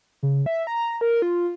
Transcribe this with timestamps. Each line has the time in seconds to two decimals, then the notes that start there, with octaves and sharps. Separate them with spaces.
0.23 C#3
0.46 E5
0.67 A#5
1.01 A#4
1.22 F4